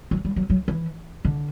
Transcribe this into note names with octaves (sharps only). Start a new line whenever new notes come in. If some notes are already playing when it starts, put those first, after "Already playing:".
F#3
G3
F#3
F#3
E3
D3